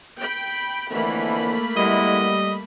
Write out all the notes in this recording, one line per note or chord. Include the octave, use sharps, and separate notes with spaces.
G5 B5
F2 D3 E3 A3 A#3 B5
G3 G#3 B3 E4 D#5